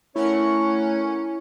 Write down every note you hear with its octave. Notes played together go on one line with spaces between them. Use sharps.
A3 C#4 E4 A#4 C#5 F#5